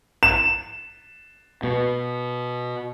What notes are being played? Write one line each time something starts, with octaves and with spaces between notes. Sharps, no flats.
E7
B2